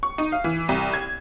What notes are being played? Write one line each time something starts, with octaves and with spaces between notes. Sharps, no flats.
C#6
D#4
F5
E3
C2
G#6